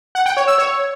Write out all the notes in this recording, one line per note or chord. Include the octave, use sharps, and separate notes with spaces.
F#5
G5
C#5
E6
C#5